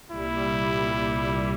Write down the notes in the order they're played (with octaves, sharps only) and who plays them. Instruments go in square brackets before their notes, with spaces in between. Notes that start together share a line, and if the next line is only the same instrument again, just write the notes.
[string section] C2 A#2 G3 [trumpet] E4